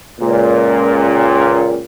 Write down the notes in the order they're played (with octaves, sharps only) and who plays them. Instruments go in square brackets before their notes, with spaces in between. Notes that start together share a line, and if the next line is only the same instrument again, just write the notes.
[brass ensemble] C#2 A#2